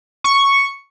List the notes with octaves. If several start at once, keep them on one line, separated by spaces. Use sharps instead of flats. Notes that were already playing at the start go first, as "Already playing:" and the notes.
C#6